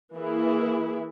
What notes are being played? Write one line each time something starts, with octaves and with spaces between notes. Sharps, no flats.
E3 A#3 E4 G#4